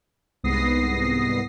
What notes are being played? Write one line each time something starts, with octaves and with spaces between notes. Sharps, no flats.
C2 G#2 B3 D#6 A#6 C7